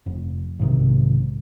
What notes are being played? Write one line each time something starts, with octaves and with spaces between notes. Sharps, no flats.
F1
B1 G#2 C3 D#3